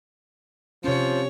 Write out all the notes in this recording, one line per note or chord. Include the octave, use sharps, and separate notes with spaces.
C3 F3 C#4 C#5